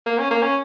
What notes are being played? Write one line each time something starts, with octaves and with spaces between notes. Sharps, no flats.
A#3
C#4
A#3
C#4